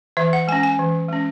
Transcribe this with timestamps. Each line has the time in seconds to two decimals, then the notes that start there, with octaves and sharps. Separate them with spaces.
0.17 E3 E5
0.33 F#5
0.48 G#3 C#4 G#5
0.63 G#5
0.79 E3
1.09 G#3 C#4